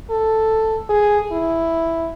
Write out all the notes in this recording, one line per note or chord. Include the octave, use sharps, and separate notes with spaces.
A4
G#4
E4